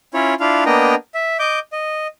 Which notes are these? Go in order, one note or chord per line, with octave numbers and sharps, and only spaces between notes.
C#4 E4 F4 C#5
D4 E4 F4 F5
A#3 B3 D4 D#5 G5 A#5
E5
D#5 D6 G6
D#5